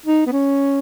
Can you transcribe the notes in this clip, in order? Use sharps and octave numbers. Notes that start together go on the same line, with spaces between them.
D#4
B3
C#4